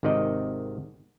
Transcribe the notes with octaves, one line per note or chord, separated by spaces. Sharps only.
G#1 C3 D#3 D5 D#5